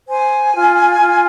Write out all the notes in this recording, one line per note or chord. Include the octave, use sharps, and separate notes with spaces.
C5 G#5
F4
F4